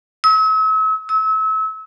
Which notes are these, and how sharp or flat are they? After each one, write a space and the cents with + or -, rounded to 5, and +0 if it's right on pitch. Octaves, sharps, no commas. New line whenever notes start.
E6 -40
E6 -35